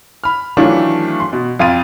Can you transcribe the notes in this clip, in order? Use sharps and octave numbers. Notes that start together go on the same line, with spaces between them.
B5 F6
D#3 E3 F#3 A3 D4 F4
C6
B2
F2 F5 C6 A6 D#7